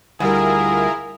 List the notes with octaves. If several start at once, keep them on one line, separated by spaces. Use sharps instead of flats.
D2 G3 E4 F4 G#4 A#4